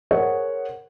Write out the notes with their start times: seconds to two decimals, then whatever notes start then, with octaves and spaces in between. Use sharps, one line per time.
0.11 G#4 A#4 C5 C#5 F#5